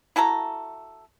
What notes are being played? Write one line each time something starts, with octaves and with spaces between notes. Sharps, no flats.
E4 F#4 A4 A#5